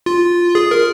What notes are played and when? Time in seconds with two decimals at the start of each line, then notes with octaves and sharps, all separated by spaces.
0.06 F4
0.55 G#4
0.71 A#4